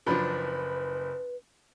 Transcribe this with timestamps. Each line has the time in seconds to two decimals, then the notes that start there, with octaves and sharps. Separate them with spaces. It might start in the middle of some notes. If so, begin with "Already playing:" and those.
0.06 F#1 F3 F#3 D4 B4 B5